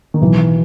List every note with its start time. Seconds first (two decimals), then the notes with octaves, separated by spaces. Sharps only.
0.14 D#3
0.21 B1 E3